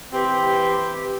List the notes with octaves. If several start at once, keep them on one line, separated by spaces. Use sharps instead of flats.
E3 C4 G4 B4